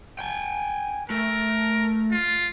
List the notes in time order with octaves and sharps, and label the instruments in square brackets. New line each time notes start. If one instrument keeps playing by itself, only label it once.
[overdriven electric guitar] G5 G#5
[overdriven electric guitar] A3 [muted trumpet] A#4
[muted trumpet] F4